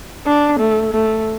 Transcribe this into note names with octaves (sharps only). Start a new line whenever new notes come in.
D4
A3
A3